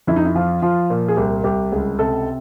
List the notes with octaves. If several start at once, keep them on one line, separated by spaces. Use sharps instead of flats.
F2 E4
D#4
E4
F3 F4
F3 F4
A#2
G#4
C2 G4
C2 G4
C#2 G#4
C3 A4